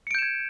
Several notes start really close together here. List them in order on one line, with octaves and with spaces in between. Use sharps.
C#7 D7 G6 E7 G#6